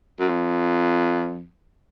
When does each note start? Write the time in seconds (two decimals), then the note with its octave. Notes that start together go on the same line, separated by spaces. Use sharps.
0.19 F#2
0.29 F2